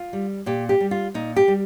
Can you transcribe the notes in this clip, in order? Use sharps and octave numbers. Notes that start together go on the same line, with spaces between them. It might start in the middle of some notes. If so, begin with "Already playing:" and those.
Already playing: F4
G3
A#2 G4
G4
G3
F4
A#2 D#4
G4
G3